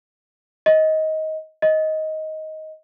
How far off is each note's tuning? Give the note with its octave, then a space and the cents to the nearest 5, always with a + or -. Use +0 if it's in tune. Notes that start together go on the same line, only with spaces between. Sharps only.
D#5 +20
D#5 +15